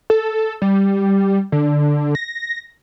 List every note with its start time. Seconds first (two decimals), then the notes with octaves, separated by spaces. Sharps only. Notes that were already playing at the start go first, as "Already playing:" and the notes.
0.10 A4
0.62 G3
1.52 D3
2.15 A#6